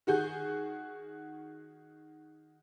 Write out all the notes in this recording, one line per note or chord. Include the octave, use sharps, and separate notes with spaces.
D#3 F#4 G#4 G6